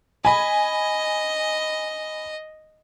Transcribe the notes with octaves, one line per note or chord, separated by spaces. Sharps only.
D#5 G#5 B5